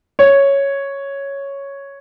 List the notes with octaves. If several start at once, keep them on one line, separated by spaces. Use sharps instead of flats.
C#5